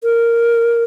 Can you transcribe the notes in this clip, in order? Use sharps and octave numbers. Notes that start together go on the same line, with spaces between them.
A#4